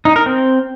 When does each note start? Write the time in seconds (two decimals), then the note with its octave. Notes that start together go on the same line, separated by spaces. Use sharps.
0.05 D#4
0.16 A#4
0.26 C4